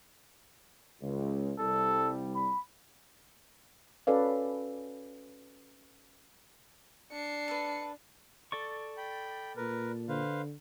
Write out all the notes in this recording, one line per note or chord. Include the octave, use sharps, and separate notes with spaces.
C#2
C2 G3 A4
B5
C#4 F#4 A4 B4 D5 F5
D4 C7 C#7
A4 B4
A4 D5 C#6
G5 B5
A#2 A#4 B4
D3 B4 C5 F5